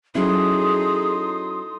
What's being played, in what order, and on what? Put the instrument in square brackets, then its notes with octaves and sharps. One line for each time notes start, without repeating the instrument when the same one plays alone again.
[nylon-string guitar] F#3 C#4 E4 [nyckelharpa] D#4 A4 [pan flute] G#4 [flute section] C6 D#6